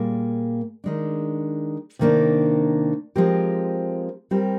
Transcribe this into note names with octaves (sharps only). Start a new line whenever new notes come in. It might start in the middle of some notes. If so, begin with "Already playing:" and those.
Already playing: A#2 G3 A#3 G#4
D#3 G#3 D4
C3 D#3 A#3 D4
F3 G#3 C4 G4 A#4
G3 C4 G4 A#4